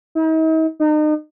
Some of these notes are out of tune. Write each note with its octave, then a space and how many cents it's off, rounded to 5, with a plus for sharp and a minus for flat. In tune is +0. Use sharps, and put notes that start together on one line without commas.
D#4 +45
D#4 -35